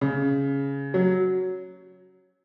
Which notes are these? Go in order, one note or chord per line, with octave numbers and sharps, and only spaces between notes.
C#3
F#3